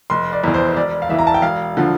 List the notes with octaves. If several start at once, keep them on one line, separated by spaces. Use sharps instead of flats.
F1 C6
D5
E2 E3
C5
C5
E1 D5
F5
E2 E3 E5
A#5
A5
G5
E1 F5
D3 F3